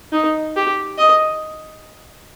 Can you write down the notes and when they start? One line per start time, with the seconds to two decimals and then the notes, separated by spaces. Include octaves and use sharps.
0.12 D#4
0.56 G4
0.98 D#5